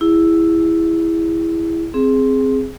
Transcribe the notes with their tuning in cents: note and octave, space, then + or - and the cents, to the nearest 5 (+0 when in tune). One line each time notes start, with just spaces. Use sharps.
E4 +0 G#4 -25
C4 +5 G#4 +0